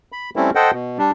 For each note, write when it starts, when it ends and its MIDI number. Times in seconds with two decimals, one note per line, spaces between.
0.12 0.30 83
0.36 0.51 55
0.36 0.51 57
0.36 0.51 60
0.36 0.51 61
0.36 0.51 64
0.55 0.71 69
0.55 0.71 72
0.55 0.71 75
0.55 0.71 78
0.55 0.71 79
0.72 0.98 47
0.98 1.11 55
0.98 1.11 62